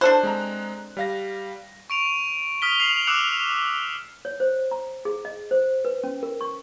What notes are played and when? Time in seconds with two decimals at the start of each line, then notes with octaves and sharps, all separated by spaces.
0.01 D4 A4 C5 F#6
0.23 G#3 C4 A#5
0.97 G3 F5 A#6
1.90 C#6 D7 F7
2.62 D#6 F6 B6 G7
2.80 F6 C7 F7 F#7
3.07 D6 E6 F#6 C#7 F7
4.25 C#5
4.40 C5
4.71 A#5
5.05 G#4
5.25 D#5
5.51 C5
5.85 B4
6.04 C#4
6.23 A#4
6.41 C#6